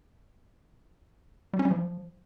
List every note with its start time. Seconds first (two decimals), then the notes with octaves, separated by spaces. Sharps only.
1.53 G3
1.59 C#4
1.65 G3
1.71 F3